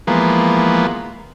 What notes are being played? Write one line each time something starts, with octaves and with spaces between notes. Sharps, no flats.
E3 F3 G#3 A#3 B3